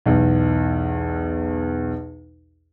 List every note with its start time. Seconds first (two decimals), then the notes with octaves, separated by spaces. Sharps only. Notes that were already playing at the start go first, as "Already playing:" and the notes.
0.06 B1 E2